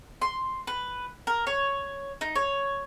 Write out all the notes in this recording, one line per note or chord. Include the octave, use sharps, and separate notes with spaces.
C6
B4
A#4
C#5
D#4
C#5